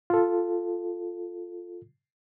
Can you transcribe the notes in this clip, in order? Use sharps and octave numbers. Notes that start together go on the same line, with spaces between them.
F4 A4